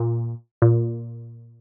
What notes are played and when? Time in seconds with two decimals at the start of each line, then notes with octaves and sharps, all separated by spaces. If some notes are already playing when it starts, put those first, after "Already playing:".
Already playing: A#2
0.62 A#2